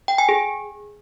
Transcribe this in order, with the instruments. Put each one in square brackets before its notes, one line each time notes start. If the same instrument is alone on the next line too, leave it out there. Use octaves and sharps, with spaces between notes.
[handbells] G5
G#5
G#4